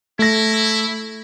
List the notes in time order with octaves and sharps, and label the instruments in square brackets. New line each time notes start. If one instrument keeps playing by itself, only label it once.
[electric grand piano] A3 A#6 [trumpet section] E4